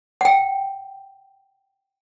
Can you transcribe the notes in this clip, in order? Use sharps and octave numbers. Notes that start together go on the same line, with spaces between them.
F#5 G5